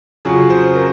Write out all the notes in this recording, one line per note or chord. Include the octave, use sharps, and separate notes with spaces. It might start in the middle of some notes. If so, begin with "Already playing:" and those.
F2 C#3 F#3 C#4 G#4
C5
A#4